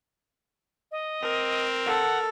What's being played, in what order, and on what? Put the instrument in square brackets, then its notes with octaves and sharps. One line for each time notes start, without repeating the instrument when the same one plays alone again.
[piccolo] D#5
[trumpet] C4 [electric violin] A#4
[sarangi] A4 [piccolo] F#5